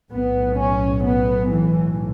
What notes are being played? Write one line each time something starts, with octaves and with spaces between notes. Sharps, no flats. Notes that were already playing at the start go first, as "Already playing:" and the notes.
B1 A2 B3
C#4
B3
E3